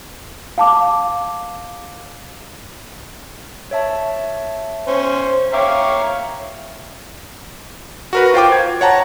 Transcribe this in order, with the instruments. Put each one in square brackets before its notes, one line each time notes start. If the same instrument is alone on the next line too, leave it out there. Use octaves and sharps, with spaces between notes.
[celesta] F5 A5 D6
[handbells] C#5 E5 A5
[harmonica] C#4 C5
[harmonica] C#5 F5 A#5 [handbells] E5 G5 D6
[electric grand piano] F#4 A#4 B4
F4 C5 G5 D6
G#6
C#5 F#5 A5 A#5